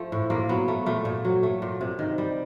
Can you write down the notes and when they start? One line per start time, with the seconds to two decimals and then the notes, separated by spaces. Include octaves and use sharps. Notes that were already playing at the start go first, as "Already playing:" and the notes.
Already playing: F3 A3
0.12 A2
0.30 A#2 A#3
0.49 F#3 B3
0.68 A3
0.86 A#2 A3
1.05 A#2
1.25 F#3
1.43 A3
1.62 A#2
1.81 C3
1.99 D#3
2.18 G3